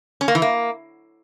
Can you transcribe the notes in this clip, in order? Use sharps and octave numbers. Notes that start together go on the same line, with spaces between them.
C#4
A#3
E3
A#3